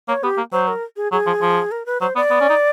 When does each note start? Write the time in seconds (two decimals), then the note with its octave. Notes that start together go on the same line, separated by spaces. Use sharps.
0.08 A#3 C#5
0.23 B3 G4
0.37 A#3
0.52 F#3 C5
0.68 A#4
0.97 G#4
1.12 F#3 G#4
1.27 F3
1.42 F3
1.71 A#4
1.86 B4
2.01 F#3 C5
2.16 B3 D5
2.31 B3
2.41 C#4
2.50 D#4